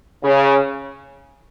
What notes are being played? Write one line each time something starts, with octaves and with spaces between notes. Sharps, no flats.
C#3